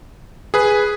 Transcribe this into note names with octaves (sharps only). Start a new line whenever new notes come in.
G#4 B4